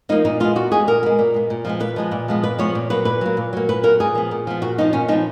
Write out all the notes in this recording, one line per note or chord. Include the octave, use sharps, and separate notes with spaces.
F3 A#3 D#4
A#2 D#4
G#3 B3 F4
A#2 F#4
G#3 B3 G#4
A#2 A#4
G#3 B3
A#2
G#3 B3
A#2
F3 G#3 B3
A#2 B4
F3 G#3 B3
A#2
F3 G#3 B3
A#2 B4
F3 G#3 B3 C#5
A#2
F#3 A#3 B4
A#2 B4
F#3 A#3
A#2
F#3 A#3
A#2 B4
F#3 A#3 A#4
A#2 G#4
F3 B3
A#2
F3 B3
A#2 F#4
F3 B3 D#4
A#2 C#4
F3 B3 D#4